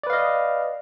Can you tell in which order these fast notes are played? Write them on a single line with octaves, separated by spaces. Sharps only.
D5 B4 F5 D#5